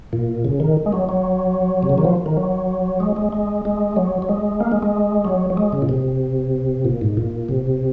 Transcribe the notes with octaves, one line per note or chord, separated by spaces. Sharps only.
A#2
C#3
D#3
G#3
F#3
F#3
C3
C#3
D#3
F3
D#3
F#3
G#3
G#3
G#3
G#3
F#3
F#3
G#3
A#3
G#3
G#3
F#3
F#3
G#3
C#3
A#2
C3
A#2
G#2
A#2
C3